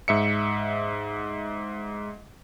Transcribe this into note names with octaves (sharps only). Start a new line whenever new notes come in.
G#2 E5 C#7